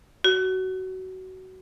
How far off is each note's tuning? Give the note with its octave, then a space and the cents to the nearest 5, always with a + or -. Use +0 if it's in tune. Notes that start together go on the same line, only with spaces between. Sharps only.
F#4 +20